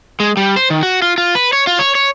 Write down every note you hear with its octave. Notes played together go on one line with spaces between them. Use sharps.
G#3
G3
C5
D#3
F#4
F4
F4
B4
C#5
F4
C#5
C#5